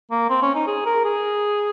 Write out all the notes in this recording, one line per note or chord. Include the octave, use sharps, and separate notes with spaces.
A#3
C4
C#4
D#4
G#4
A#4
G#4